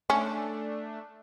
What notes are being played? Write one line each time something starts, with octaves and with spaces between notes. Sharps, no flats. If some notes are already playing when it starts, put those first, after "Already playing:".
A3 C#4 D4